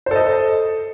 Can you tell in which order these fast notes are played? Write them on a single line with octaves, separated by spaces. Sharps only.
C5 A4 D#5